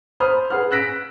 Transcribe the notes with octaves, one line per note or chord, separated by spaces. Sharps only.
C5 B5 D#6 F6
G#4 B4 F#5 F6
E6 F#6 A#6 B6 D7